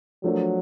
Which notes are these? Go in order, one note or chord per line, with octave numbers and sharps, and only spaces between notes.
F3 F#3 A3 D4 F4 A#4